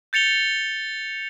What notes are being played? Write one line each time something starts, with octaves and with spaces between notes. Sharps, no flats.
G6 A6 C#7 F7 G7